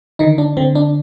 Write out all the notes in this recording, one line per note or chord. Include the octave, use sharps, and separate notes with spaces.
D3 D#3 D#4
D4
D3 C4
D4